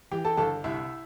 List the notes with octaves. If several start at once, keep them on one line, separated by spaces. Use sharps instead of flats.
E3 G4 G5
A4 A5
G1 A4 A5
C2 E4 E5